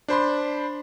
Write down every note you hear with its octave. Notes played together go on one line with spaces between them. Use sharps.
D4 C5 B5 C6